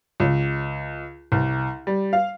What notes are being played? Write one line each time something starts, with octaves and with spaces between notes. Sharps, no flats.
C#2
C2
G3
F5